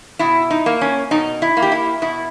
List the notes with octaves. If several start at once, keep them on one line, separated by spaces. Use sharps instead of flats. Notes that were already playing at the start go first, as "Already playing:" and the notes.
B2 E4
D#4
A#3
C#4
B2 D#4
E4
A#3
G4
E4
B2 E4